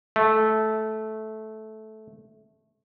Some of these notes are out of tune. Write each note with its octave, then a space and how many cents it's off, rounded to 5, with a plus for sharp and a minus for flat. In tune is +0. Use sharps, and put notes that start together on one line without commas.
A3 -15